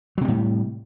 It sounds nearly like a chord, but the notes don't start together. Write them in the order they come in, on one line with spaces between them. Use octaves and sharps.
F#3 C3 G3 A2